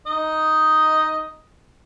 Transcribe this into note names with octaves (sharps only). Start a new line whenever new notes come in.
D#4 D#5